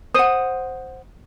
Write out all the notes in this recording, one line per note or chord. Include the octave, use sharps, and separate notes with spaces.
C5 F#5 D#6